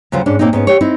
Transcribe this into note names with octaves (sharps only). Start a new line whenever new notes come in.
D2 C#3 F#3 F4 C5
G#2 C#4 D4
A#2 A#3 C4 C#4 D#4
G#2 B3 C#4
G4 C#5
C4 D#4 E4